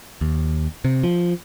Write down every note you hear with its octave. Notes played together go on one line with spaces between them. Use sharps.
D#2
C3
F3